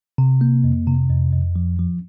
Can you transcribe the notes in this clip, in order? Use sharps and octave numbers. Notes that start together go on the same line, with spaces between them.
C3
A#3
F2
C3
F2
F2
F3
F3